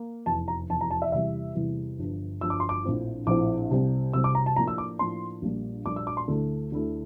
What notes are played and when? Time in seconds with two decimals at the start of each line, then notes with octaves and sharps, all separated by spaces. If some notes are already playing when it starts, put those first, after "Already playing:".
Already playing: A#3
0.26 F1 E2 E3 A5
0.48 A#5
0.69 F1 E2 E3 A5
0.81 A#5
0.91 A5
1.02 E5
1.12 E2 C3 E3 G3 E5
1.55 E2 C3 E3 G3
1.98 G1 G2 F3
2.41 G1 G2 F3 E6
2.50 D6
2.60 C6
2.69 D6
2.84 A#1 A2 F3 C4 E4
3.27 A#1 A2 F3 C4 E4 D6
3.70 C2 C3 G3 C4
4.13 C2 C3 G3 C4 E6
4.24 D6
4.35 A#5
4.46 A5
4.56 A2 F3 A#3 D4 A#5
4.68 E6
4.78 D6
4.99 A2 F3 A#3 D4 C6
5.42 A#1 A#2 G3 A#3 D4
5.86 A#1 A#2 G3 A#3 D4 D6
5.96 E6
6.07 D6
6.17 C6
6.28 D2 D3 A3 E4
6.72 D2 D3 A3 E4